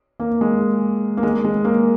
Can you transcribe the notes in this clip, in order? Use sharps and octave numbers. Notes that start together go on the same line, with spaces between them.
A#3
G#3
A#3
G#3
G#3
A#3